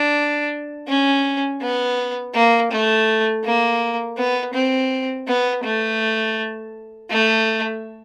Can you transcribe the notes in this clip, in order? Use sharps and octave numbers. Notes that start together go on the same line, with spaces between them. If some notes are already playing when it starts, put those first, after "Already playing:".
Already playing: D4
C#4
B3
A#3
A3
A#3
B3
C4
B3
A3
A3